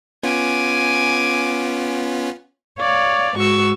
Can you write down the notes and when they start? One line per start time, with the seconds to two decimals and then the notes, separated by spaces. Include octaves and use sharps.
0.23 B3 C#4 F4 G#5 D6
2.79 C#5 D5 F5
3.36 G#2 F#4 C#6 E6